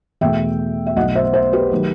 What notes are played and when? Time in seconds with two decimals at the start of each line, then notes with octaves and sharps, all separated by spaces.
0.21 E2 B2 A3 E5 G5
0.87 E5
0.96 B1 B2 A3 D#5 F#5
1.15 C5 E5
1.33 C5 E5
1.53 G4 B4
1.72 D#3 F#3 A3